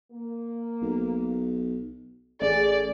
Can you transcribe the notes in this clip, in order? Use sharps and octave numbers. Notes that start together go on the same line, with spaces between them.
A#3
B1
A1 A3 G#4 D5